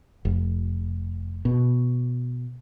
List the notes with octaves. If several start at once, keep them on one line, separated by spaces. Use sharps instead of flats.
F1
B2